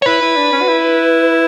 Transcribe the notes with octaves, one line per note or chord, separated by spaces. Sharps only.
C#5
E4 B4
E4
D4
C#4
F#4
E4